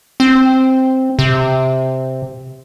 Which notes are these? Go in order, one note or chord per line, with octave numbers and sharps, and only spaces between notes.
C4
C3